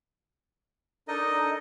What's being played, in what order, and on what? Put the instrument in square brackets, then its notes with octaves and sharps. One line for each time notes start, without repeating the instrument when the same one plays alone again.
[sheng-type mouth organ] D4 A4 A#4 [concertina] D#4 D#5